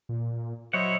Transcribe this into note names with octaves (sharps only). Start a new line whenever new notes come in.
A#2
F#3 E4 C5 C#5 D#5 E5 F#5